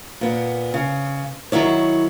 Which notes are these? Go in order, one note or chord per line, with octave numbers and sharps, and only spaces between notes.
A#2 B3
C#3
D#3 F#3 E4 C#5